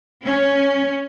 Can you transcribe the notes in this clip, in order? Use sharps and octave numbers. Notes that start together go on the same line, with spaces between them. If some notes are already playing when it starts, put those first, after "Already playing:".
C#4